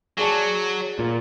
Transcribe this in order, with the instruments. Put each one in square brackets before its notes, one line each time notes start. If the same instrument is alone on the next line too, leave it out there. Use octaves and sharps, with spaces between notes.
[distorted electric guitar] F#3 [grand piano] G#4 D5 A5
[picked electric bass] A#2